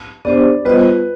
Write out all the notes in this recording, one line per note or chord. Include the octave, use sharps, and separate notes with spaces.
B3 D4 G4 C5 D5
G3 B3 F4 B4 C5 D#5